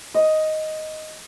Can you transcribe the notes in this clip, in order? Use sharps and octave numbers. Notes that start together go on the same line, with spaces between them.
D#5